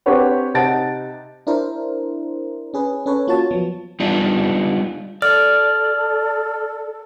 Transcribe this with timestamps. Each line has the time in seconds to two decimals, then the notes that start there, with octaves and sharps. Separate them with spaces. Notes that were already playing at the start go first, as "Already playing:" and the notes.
0.06 C4 D4 G4 B4 C#5 F#5
0.54 C3 D#4 F#5 A5 A6 D7
1.47 D4 E4 A#4 C5
2.74 C#4 G#4 B4
3.06 C#4 A4 B4 C#5
3.27 A#3 F4 F#4 C#5 A5
3.51 F3 F#3 B3
4.00 G3 B3 D4 D#4 F4
5.22 A4 D5 F6